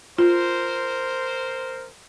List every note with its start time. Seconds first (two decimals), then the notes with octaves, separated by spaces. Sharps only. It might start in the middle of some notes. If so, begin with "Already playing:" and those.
0.19 F4 A#4 C5